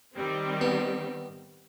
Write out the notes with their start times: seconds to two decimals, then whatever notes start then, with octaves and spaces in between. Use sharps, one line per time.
0.16 D#3 G3 C4
0.61 B3